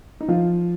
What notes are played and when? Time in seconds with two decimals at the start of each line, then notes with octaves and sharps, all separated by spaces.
0.21 D#4
0.28 F3 F4